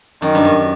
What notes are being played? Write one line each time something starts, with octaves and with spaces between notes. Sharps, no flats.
F#2 D#3
G2
F#2